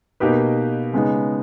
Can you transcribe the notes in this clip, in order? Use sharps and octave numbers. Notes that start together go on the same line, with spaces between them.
B2 A#3 D#4 G4 B4
C#3 G#3 B3 D#4